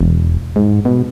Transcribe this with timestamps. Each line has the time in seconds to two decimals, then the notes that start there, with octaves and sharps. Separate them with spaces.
0.01 E1
0.56 G#2
0.85 B2